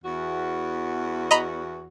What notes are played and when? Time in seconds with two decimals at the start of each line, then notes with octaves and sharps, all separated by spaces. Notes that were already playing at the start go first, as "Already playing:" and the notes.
0.03 E2 F#4
1.31 D#5 A#5 B5